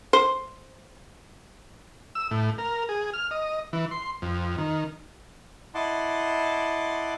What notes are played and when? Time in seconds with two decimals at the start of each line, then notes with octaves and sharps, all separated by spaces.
0.13 C5
2.15 E6
2.31 A2
2.58 A#4
2.89 G#4
3.13 F6
3.31 D#5
3.73 E3
3.91 C6
4.22 F2
4.58 D#3
5.75 E4 D#5 F#5 A5 C6 D6